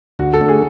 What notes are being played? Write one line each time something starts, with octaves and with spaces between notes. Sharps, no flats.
D2 F#4
A4
D3 A3
G#4